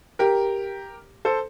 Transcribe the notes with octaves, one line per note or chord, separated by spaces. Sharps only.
G4 A#4
A4 C5